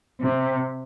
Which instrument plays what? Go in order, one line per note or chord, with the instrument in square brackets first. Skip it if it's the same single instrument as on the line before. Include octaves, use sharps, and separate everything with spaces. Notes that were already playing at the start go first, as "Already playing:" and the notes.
[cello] C3